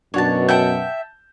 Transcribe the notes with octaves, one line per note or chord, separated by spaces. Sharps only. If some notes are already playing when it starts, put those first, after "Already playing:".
F#2 B2 D4 F#4 C#5 A5
E5 F#5 G5 A5 G6